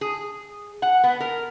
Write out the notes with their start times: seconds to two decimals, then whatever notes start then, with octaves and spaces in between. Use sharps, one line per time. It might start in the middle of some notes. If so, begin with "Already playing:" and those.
0.01 G#4
0.82 F#5
1.04 B3
1.20 A#4